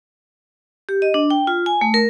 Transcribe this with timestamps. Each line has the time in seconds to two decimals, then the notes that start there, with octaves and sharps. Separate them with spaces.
0.89 G4
1.02 D#5
1.14 D4
1.30 G5
1.47 F4
1.66 G#5
1.81 A3
1.94 A#4